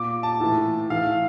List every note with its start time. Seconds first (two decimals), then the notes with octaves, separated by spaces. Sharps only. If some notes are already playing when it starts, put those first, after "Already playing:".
Already playing: A#2 D6
0.23 A5
0.40 A2 E3
0.90 A2 E3 F5